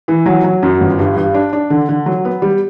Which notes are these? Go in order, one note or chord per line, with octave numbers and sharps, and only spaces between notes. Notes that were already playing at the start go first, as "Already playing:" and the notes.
E3
F#3
F#3
F#2
G1
G2
G2
D4
D4
D3
D3
F#3
B3
G3